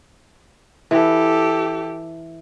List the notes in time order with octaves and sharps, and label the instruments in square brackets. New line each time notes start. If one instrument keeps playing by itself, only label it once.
[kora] E3 [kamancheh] G4 A4